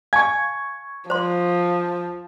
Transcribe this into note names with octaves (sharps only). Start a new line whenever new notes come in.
F5 G#5 A5 C#6 G#6
F3 C5 C6